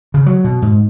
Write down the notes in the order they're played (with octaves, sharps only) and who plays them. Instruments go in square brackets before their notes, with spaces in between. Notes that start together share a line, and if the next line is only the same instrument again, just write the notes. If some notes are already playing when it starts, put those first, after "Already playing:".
[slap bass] C#3
F#3
B2
G#2